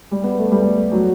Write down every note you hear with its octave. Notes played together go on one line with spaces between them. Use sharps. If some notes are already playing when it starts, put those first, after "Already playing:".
G3
B3
A3
G3
F#3